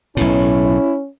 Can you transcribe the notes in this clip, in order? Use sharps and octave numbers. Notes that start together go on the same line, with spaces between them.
B1 A2 C#4 E4